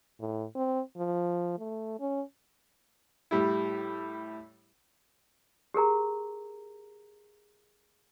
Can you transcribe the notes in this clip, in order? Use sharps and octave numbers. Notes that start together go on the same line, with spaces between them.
A2
C4
F3
A3
C#4
A2 G3 E4
G4 G#4 A#4 A#5